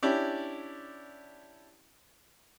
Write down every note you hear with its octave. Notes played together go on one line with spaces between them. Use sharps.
C#4 D4 E4 G4 D5